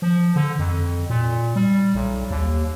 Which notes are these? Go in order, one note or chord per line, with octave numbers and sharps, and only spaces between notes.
F3
D3
F2
A#2
G3
B1
D#2